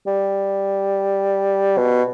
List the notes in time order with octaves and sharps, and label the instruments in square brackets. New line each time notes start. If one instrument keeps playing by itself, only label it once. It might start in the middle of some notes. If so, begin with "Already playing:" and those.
[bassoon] G3
B2